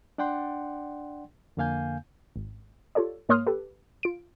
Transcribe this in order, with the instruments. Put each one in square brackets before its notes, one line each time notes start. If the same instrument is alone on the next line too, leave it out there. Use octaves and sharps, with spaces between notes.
[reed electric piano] D4 D5 F#5 G5 C6
F2 D3 A#3 F5 G#5 G6
[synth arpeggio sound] G#1
F4 G4 A4 C#5 D5
G#2 A#3 C#5 C6 D#6 F6
G4 A4 B4
F4 D7